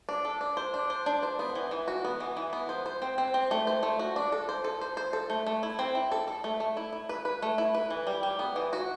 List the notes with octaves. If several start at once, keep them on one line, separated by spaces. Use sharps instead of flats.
D4
A4
D4
C5
D4
C5
D4
C5
B3
E3
E3
F#4
B3
E3
E3
B3
C5
C5
C4
C4
C4
A3
C5
A3
F#4
D4
A4
C5
A4
C5
C5
A4
A3
A3
E4
C4
E4
A4
A4
A3
A3
E4
E4
B4
B4
A3
E4
B4
E3
G3
G3
B3
E3
F#4